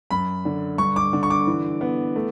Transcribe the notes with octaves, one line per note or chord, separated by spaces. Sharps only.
F#2 B5
D3
G2 C#6
D6
D3
C#6
D6
E3
B3
A3